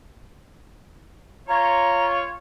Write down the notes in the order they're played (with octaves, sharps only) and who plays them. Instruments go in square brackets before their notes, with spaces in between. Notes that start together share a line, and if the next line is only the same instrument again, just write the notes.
[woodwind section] F4 C#5 [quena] A#5